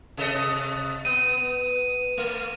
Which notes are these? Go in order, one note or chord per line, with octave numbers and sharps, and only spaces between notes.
C3 A4 D#5
B3 D#7
A3